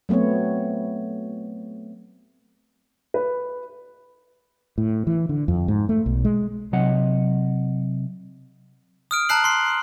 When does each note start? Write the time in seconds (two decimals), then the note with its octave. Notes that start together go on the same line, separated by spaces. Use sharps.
0.09 F#3 A3 B3 C4 C#5
3.14 B4
4.78 A2
5.07 E3
5.29 D3
5.48 F2
5.68 G#2
5.89 A3
6.06 B1
6.25 G#3
6.73 C3 F#3 D#5 F#5
9.11 D#6 F6 D7
9.29 A5 A#5 F#6 C7 F#7
9.44 C6 C7